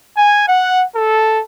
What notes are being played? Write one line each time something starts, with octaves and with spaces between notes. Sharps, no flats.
G#5
F#5
A4